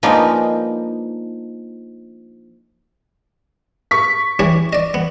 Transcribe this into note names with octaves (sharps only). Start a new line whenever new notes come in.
F3 G#3 A#3 B3 D4 D#4
C#6 B6
E3 G4 C#5
D5 D#5
B3